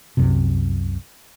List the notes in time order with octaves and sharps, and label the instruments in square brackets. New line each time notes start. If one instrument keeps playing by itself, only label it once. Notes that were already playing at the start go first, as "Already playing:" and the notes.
[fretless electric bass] C2 F#2 C3